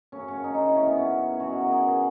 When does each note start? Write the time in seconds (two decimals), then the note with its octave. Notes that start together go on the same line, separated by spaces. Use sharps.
0.12 F#2 C#3 F#3 C#4
0.28 C#4
0.44 D#4
0.55 D#4
0.65 E4
0.76 C#4
0.87 B3
0.97 C#4
1.35 G#4
1.40 B2 F#3 F#4
1.61 A#4
1.72 G#4
1.88 G#4